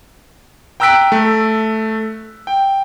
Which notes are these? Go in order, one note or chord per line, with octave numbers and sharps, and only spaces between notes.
G5 A#5 E6 F#6 B6 D7
A3
G5